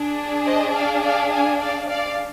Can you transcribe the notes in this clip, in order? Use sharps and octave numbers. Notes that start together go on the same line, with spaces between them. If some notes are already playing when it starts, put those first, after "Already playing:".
Already playing: D4 G#4
C5 D#5
D5 F5
D5 F5
F5 G#5
D5 F5
D5 F5